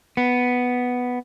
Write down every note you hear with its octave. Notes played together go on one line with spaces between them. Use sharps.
B3